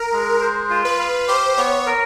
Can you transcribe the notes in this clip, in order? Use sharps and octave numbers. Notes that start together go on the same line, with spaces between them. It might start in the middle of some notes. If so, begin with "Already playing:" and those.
Already playing: A#4
G#3
C5
F4
B4
F5
G4 C5
B3 C#5
A#4